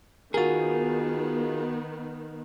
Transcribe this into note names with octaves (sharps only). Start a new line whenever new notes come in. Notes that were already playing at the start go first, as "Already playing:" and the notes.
D#3 B3 F4 F#4 G#4 A#4